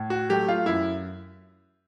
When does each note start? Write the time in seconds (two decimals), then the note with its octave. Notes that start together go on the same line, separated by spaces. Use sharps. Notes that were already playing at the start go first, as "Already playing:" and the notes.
Already playing: A2
0.10 F#4
0.29 F#3 A3 G4
0.48 F4
0.66 F#2 E4